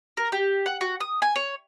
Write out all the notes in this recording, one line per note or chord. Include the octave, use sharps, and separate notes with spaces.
A#4
G4
F#5
F#4
D#6
G#5
C#5